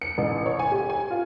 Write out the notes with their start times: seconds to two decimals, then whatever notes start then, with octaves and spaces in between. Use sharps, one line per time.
0.02 C#7
0.18 A1
0.46 C#5
0.59 G#5
0.72 G4
0.90 G#5
1.11 F4